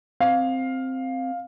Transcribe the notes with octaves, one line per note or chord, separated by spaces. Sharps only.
C4 F5